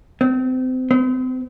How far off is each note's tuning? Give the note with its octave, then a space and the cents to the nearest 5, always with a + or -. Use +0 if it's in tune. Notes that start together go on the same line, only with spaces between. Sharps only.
C4 -30
C4 -40